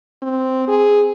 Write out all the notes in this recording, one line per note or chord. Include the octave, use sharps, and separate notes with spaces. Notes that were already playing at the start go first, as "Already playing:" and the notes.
C4
G#4